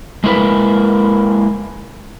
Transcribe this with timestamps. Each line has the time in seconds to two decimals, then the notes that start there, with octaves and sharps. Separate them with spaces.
0.24 G#3 A#3 E4 A#4 B4